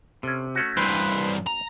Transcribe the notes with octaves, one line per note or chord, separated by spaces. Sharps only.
C3 C#4 A4
A3 C#4 F#4
G2 E3 B4 C5
A#5